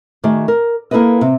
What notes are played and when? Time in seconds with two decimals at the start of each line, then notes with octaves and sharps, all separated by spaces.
0.24 D#3 A3 F#4 G#4 D5
0.48 A#4
0.91 A#3 E4 F4 A4 B4 D#5
1.21 C3